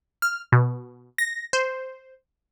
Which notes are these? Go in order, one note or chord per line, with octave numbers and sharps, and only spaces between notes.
F6
B2
A#6
C5